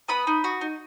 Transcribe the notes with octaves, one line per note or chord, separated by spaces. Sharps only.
B3 B5 D#6
D#4
F#4
D#4